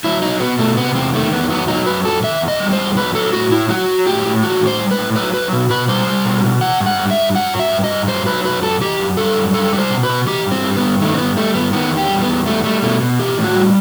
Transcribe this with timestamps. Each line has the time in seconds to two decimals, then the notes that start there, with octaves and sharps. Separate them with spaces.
0.04 F#3 E4
0.22 F#3 D#4
0.40 B2 B3
0.59 B2 A3
0.77 C3 B3
0.95 E2 C4
1.14 D#3 A3
1.32 E2 B3
1.50 F#3 B3
1.68 F#3 D#4
1.86 F#2 B4
2.05 F#2 A4
2.23 D#3 E5
2.41 E2
2.48 D#5
2.60 G3
2.73 E2 C5
2.97 F#3 B4
3.15 F#3 A4
3.33 A2 F#4
3.51 A2 E4
3.69 F#3 F#4
3.88 F#3
4.06 A2 G4
4.25 A2
4.43 E3 F#4
4.60 A2
4.67 C5
4.79 G3
4.91 B4
4.97 A2
5.16 F#3 B4
5.34 F#3 B4
5.53 B2
5.70 B2 B4
5.88 G3 C5
6.07 G3
6.25 B2
6.44 B2
6.61 E3 F#5
6.80 G2
6.86 F#5
6.99 G3
7.11 E5
7.17 G2
7.35 F#3 F#5
7.53 F#3
7.60 E5
7.72 G2
7.84 D#5
7.90 G2
8.08 F#3 C5
8.26 F#3 B4
8.44 F#2 B4
8.62 F#2 A4
8.81 E3 G4
8.99 F#2
9.17 G3 A4
9.36 F#2
9.54 G3 A4
9.73 G3
9.78 C5
9.90 B2
10.03 B4
10.09 B2
10.27 E3 G4
10.46 G2
10.52 C4
10.64 G3
10.77 B3
10.82 G2
11.00 D#3 A3
11.14 C4
11.18 G2 B3
11.37 G3 A3
11.55 G2 B3
11.73 D#3 B3
11.92 E2
11.97 G4
12.10 G3
12.22 B3
12.28 E2
12.46 G3 A3
12.64 G3 A3
12.83 B2 A3
13.01 B2
13.19 E3 G4
13.38 A2
13.44 F#4
13.56 G3